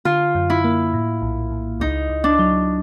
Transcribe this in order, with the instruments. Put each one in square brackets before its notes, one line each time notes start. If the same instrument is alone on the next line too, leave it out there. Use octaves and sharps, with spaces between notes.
[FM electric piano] D3 [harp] F4
[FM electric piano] F#2
[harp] E4
[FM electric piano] A#3
A2
A#1
A#1
[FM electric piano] C#2 [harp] D#4
[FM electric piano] C#2
[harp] D4
[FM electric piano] F#3